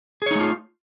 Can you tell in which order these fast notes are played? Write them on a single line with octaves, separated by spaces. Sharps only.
G#4 C#5 D#4 A3 F4